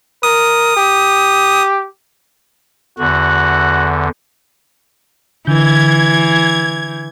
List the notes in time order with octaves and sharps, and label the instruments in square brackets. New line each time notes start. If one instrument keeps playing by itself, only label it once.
[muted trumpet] A#4 [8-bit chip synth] D#6
[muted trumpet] G4
[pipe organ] E2 D3 [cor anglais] F#4
[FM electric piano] D3 G6 [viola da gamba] E3 [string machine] G#6